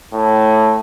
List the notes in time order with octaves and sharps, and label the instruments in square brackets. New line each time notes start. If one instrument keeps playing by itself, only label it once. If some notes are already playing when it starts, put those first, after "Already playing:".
[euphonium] A2